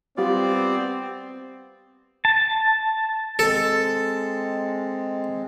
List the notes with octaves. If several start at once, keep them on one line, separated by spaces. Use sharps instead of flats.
G3 B3 C4 F4 D5
A5
G#3 C4 A4